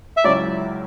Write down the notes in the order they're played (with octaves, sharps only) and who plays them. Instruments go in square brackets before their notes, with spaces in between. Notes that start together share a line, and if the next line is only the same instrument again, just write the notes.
[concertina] E5
[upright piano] C#2 C#3 F#3 C#4 E4 [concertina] D5